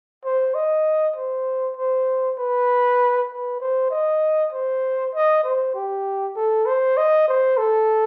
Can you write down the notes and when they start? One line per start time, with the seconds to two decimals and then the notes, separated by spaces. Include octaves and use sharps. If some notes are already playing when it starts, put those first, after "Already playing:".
0.25 C5
0.54 D#5
1.16 C5
1.76 C5
2.38 B4
3.29 B4
3.60 C5
3.90 D#5
4.52 C5
5.14 D#5
5.43 C5
5.75 G4
6.36 A4
6.66 C5
6.97 D#5
7.28 C5
7.58 A4